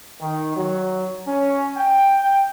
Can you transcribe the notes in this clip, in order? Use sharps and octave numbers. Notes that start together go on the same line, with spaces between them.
D#3
F#3
C#4
G5